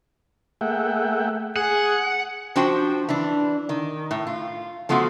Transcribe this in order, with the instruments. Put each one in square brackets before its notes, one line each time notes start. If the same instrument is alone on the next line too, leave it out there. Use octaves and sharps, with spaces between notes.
[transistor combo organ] A3 A#3 G#4 E5 F#5 G5
[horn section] G#4 [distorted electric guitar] F#5
[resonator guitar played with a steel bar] F3 D4 F#4 C5 G5
E3 D4
D#3
A2
F4
F3 A3 B3 F4 F#4